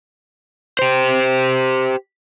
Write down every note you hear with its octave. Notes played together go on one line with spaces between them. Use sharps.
G4 C5